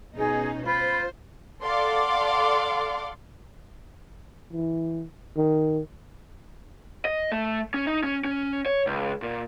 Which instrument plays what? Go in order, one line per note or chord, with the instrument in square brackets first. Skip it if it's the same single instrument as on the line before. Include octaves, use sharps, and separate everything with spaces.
[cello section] B2 C#4 D#4 [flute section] G#4
[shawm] F4 [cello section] C5 [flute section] B5
[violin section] A4 D5 F5 F#5 C6 D6
[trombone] E3
D#3
[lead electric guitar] D#5
A3
C#4
D#4
C#4
C#4
C#5
C#2
A#2